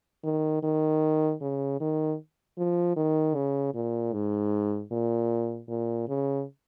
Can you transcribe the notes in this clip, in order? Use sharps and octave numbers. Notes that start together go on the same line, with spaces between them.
D#3
D#3
C#3
D#3
F3
D#3
C#3
A#2
G#2
A#2
A#2
C#3